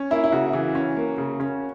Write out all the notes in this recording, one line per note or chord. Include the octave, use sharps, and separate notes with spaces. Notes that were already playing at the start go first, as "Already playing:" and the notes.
Already playing: C#4
A#3 E4
E4
C#3 F#4
E3
C#4
A#3
C#3
C#4